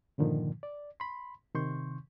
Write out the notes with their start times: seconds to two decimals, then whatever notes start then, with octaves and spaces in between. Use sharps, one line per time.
0.18 G2 A#2 D3 D#3 F3
0.63 D5
1.00 B5 C6
1.55 C3 D#3 C6 C#6 G6